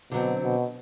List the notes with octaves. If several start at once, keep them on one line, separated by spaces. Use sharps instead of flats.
B2 D3 F#3 C4
B2